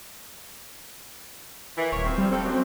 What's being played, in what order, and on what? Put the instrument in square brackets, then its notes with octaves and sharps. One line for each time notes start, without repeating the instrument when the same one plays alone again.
[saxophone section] D#3 E3
[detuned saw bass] D#1 [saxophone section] A#3 C#5
[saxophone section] C3 F3 C4
[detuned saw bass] G3
[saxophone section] G3 F4 A4 [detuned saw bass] C4
[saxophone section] F#2